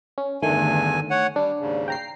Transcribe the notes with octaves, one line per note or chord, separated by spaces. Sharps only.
C#4
E2 G2 D3 D#3 A3 G#5
C#5 F#5
G3 D4
D#2 G#2 C#3
G5 A#5 C7